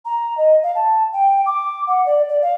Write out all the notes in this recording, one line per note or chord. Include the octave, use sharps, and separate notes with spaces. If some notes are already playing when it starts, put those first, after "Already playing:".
A#5
D#5
F5
A5
G5
D6
F#5
D5
D5
F5